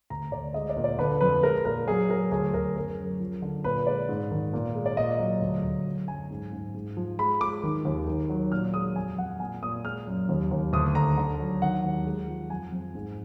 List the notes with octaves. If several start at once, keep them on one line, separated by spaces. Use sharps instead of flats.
D2 A#5
D2 D5
G#3 D#5
D5
A#2
D5
D3 B4
F2 B4
G#3 A#4
A#2 A#4
F#3 G#4
F#3 A#4
D2 G#4
D2 A#4
F#2 A#4
F#2
F3
D3
A#2 B4
G#3 D5
G#2
D#3
A#2
G#3
D5
A#2 D#5
F#3
D2
D2
F#3
F#2 G#5
G#2
G#2
G#2
F3
G#3 B5
G#3 D6
D#3
D#2
D#3
F#3
A#2 F6
G#3 D#6
F2 G#5
F2 F#5
A#2 G#5
A#2 D#6
G#3 F6
F#2
D#2
D#2
D2 D#6
D3 A#5
D3
F#3
D#3 F#5
D#2
G#3
F3
F2 G#5
F2
G#2